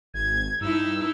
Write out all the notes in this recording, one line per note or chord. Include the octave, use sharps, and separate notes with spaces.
G#1 G#6
G2 D#4 E4 E6